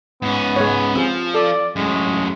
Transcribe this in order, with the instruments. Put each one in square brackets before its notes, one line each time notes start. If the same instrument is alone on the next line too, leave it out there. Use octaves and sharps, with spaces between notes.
[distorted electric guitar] G#2 C#4 [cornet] B3
[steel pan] G#3 C#5
[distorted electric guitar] F3 [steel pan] C4 G#4
[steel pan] A4 [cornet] D5
[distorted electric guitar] F#2 A2 [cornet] G#3